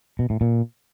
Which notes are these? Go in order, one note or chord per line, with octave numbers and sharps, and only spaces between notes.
B2
A2
A#2